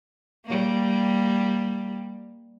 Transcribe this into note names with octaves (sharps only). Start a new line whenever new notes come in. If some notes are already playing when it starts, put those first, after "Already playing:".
G3 A#3